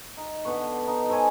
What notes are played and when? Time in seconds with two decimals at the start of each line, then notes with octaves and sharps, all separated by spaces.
0.17 D#4
0.45 D3 B3 B4 C#6
0.87 D#4
1.09 A4 C5 C#5 G#5